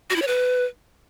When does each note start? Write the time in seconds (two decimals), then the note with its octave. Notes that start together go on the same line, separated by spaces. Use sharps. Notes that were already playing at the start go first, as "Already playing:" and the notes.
0.10 F#4
0.16 E4
0.22 C#5
0.28 B4